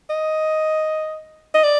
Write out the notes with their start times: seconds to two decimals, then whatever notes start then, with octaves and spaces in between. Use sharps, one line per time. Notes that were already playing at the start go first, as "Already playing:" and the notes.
0.10 D#5
1.55 D#5
1.64 D5